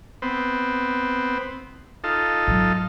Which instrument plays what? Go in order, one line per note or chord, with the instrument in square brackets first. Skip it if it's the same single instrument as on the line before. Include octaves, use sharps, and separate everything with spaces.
[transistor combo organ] B3 C4
D#4 F4 A4
[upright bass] G#2 F#3